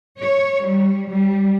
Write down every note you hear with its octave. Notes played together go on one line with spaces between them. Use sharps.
C#5
G3
G3